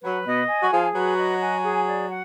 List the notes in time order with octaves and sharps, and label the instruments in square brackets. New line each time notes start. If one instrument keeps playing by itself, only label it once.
[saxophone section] F#3 [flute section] B4
[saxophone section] B2 B3 [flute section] D#5
[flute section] G#5
[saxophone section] F#4
[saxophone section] F3 F4 [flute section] G#4
[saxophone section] F#3 F#4 [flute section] B4
[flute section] D#5
G#5
G#4
D5
F#5